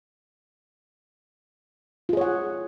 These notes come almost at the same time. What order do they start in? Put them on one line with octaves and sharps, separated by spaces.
F4 G#4 C#5 F#5